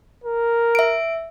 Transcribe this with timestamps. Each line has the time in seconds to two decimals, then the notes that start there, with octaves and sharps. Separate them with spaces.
0.24 A#4
0.75 E5 D7